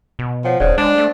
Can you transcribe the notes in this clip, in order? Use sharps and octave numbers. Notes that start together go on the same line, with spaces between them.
B2
F3 C#5 F#5 G5
D#1 C#3 E4 C5 D5
G#3 D4
A3